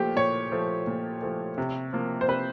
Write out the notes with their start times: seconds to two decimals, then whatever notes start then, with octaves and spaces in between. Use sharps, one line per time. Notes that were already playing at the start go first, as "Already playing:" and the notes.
Already playing: A#2 F3 A3 G4
0.16 A#2 C#5
0.52 F3 A3
0.87 A#2
1.22 F3 A3
1.58 C3
1.93 F3 A#3
2.21 C5
2.28 C3 B4